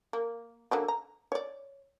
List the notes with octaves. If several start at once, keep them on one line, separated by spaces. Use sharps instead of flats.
A#3
D3 F#3 A#3
A#5
C#5 D5